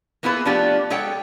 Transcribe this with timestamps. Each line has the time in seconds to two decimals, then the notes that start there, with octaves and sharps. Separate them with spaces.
0.23 A#3 B3 E4 F4 G#4 B4
0.45 F3 A3 B3 D4 F4 G4
0.90 G#3 G4 A4 C#5 F#5 G5